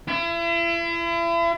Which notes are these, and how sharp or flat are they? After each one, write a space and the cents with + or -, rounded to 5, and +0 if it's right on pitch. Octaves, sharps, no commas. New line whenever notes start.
E4 +40